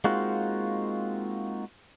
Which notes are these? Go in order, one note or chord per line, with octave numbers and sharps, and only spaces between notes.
G#3 A#3 C4 D#4 F4 F#4